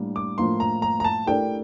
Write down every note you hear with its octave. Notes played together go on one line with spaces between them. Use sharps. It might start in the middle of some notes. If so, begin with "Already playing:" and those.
Already playing: A2 G3 A#3 D4
D6
A2 F3 A#3 E4 C6
A#5
A#5
A#5
A5
A3 E4 G4 A#4 D5 G5